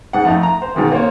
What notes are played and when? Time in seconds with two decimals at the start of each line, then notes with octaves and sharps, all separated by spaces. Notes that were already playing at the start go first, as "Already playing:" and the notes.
0.13 G#2 F#5
0.25 F2 A3 D#4
0.43 A#5
0.62 C5
0.75 G#2 B2 D#3 E3
0.92 A#3 C4 C5 C#5